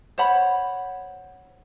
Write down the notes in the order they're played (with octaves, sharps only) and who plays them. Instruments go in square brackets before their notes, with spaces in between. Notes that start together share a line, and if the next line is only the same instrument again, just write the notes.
[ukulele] C5 C#5 F#5 B5